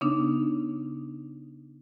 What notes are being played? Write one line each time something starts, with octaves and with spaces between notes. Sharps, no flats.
C#3 B3 D4 D#4